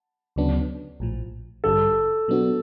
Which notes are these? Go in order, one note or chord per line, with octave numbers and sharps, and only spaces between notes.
D2 C#3 F#3 B3 D4
A#1 A2 F3
A1 G2 D3 G3 A4
B2 F#3 B3 D4 F#4